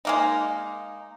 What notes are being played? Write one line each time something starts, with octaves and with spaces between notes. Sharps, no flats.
G#3 A#3 D#4